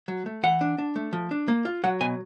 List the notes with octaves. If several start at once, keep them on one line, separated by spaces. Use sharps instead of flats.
F#3
A3
E3 F#5
D4
D4
A3
F3
D4
A#3
F4
F#3 F#5
B2 G#5